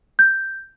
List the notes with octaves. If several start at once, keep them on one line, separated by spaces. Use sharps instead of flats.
G6